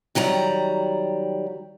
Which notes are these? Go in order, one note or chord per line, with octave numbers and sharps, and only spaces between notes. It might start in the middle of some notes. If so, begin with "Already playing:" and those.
D#3 F#3 G3 A#5